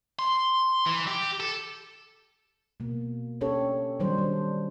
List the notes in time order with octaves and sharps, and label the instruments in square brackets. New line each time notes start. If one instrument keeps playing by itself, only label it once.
[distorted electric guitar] C6
E3
G4
A4
[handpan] B2 A#3
C#4 D4 G4 A4 C#5
D#3 F#3 G3 D4 C5
D4